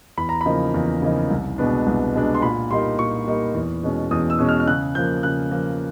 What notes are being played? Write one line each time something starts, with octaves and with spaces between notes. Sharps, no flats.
E2 B5
A#5
C#3 F3 A#3 D#4 B5
E2
C#3 F3 A#3 D#4
C2
B2 G#3 B3 D4
C2
B2 G#3 B3 D4
C6
A#2 B5
G3 A#3 D#4 C6
A#2 C#6
G3 A#3 D#4
E2
B2 G#3 C#4
E2 D#6
E6
B2 G#3 C#4
F6
F6
C#3 F#6
F3 A#3 G6
C#3 F#6
F3 A#3